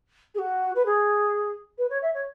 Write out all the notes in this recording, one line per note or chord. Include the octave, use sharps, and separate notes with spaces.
G#4
F#4
B4
G#4
B4
C#5
E5
C#5